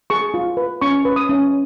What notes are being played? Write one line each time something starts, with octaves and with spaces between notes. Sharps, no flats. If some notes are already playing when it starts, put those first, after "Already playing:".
G#4 C#6
F4
B4
C#4 C#6
B4
D#6
C#4